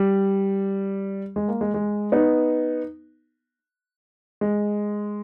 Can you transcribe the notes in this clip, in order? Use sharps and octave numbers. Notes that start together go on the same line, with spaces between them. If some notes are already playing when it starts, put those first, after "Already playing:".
Already playing: G3
G#3
A#3
G#3
G#3
B3 D#4
G#3